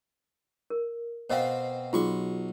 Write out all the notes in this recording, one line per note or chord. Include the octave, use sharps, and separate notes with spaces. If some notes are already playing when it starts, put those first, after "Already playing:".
A#4
B2 C4 C5 D#5 F5
B1 F4 F#4 G#4 C#6